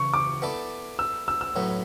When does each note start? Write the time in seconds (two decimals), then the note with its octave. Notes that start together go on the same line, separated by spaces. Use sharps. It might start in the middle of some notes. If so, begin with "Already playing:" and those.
Already playing: C#3 E3 C#6
0.14 D6
0.42 B3 E4 A4 D5
0.99 E6
1.28 E6
1.41 E6
1.56 A2 F#3 B3